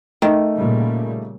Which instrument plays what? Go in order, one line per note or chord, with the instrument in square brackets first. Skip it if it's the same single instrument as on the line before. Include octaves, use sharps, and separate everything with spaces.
[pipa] D#3 [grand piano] A3
[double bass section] A#2 C#3 G3